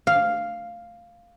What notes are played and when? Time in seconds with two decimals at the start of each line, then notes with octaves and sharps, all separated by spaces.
0.07 F5